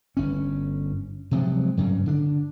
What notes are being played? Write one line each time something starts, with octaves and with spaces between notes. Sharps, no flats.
G1 C#4
C3 F3 F#3 G#3
G2 C#3 F#3 G3
D3 D4